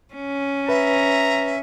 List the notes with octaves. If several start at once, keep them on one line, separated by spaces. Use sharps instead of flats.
C#4
B4 E5 A#5